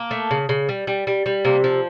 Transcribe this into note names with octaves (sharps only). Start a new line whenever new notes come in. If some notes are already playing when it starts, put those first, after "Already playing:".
Already playing: A#3
A3
C#3
C#3
G3
G3
G3
G3
C3 A#3
F3